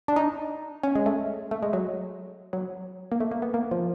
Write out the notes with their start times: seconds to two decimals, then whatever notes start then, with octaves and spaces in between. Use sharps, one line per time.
0.08 D4
0.16 D#4
0.83 C#4
0.96 G#3
1.06 A3
1.51 A3
1.63 G#3
1.73 F#3
2.53 F#3
3.12 A#3
3.20 A3
3.31 A#3
3.42 B3
3.54 A#3
3.71 F3